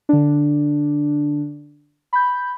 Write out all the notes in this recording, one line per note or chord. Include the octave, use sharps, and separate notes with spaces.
D3 D4
B5 G6